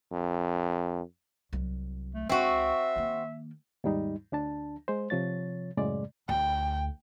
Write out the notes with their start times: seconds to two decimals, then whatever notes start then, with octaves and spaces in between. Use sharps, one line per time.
0.12 F2
1.53 C2 F#3
2.14 A3
2.29 C#2 C4 F#4 E5
2.96 D#3 A#3
3.84 D#2 G#2 G3 D#4
4.32 D2 D4 A5
4.88 G#3 C5
5.10 C3 F3 C#5 A6
5.77 F#2 A2 C#3 G#3 D5
6.29 D2 G5